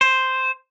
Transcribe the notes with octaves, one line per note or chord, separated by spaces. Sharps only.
C5